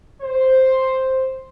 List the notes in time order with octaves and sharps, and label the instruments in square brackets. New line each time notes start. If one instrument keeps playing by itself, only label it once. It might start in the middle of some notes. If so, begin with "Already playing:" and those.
[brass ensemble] C5